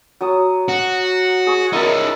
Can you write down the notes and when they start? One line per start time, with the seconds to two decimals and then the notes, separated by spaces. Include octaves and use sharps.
0.21 F#3 A5 D#6
0.69 F#4
1.47 G#4 C#6
1.73 C#4 D#4 E4 A#4 A5